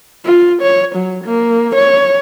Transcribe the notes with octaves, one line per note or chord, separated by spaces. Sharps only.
F4
C#5
F#3
A#3
C#5